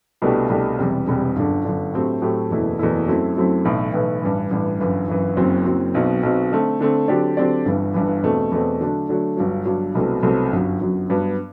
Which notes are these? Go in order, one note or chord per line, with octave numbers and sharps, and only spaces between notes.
C2 B2 A3 D4 G4
C2 B2 A3 D4 G4
E1 E2 C3 G3
E1 E2 C3 G3
G1 F#2 D3
G1 F#2 D3
A2 F#3 A3 C4 G4
A2 F#3 A3 C4 G4
F#1 E2 B2 A3 E4
F#1 E2 B2 A3 E4
F#2 F#3 A3 C4 E4
F#2 F#3 A3 C4 E4
B1 A2 E3 B3
B1 A2 E3 B3
A1 G2 E3
A1 G2 E3
G1 F#2 E3
G1 F#2 E3
F#1 F#2 F#3 C4
F#1 F#2 F#3 C4
B1 B2 F#3 C4
B1 B2 F#3 C4
D3 A3 C4
D3 A3 C4
D3 F#3 C4 G4 D5
D3 F#3 C4 G4 D5
G1 G2 E3
G1 G2 E3
E2 B2 A3 C4
E2 B2 A3 C4
D3 F#3 A3 D4
D3 F#3 A3 D4
G1 G2 F#3
G1 G2 F#3
C2 B2 F#3 A3 C4
C2 B2 F#3 A3 C4
G1 F#2 F#3
G1 F#2 F#3
G2 F#3 B3